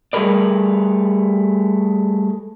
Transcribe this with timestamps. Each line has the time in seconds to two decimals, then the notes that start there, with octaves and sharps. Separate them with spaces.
0.13 G3 A3 G#4 A#4 B4 D5